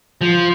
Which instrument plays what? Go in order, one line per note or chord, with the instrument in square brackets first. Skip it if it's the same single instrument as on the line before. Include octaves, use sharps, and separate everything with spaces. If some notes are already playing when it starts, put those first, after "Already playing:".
[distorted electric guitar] F3